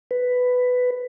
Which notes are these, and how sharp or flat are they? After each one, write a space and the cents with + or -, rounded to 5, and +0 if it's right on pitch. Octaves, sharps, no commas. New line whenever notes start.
B4 +10